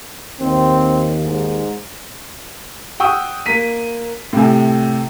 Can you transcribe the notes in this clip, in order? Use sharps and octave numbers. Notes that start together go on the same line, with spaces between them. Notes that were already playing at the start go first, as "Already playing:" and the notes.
D#2 C4
G#2
F#5 G5 C#6 D#6 E6
A#3 B6 D#7
A2 C3 G#5